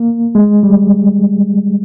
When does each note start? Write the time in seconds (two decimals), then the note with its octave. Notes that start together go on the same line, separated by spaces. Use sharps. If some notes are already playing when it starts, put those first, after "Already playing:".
Already playing: A#3
0.35 G#3
0.63 G3